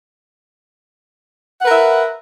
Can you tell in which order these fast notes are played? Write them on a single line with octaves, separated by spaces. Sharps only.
F#5 B4 A#4 E5